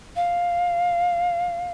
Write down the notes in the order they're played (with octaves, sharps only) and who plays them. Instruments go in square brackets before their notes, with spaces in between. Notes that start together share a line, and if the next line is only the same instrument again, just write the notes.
[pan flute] F5